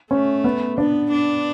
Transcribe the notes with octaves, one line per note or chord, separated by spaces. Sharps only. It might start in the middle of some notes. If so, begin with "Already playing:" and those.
A3 C#4
B3
B3 D4
D4